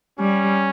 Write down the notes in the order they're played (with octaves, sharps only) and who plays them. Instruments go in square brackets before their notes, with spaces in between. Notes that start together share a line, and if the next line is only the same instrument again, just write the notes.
[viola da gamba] G3 [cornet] C#4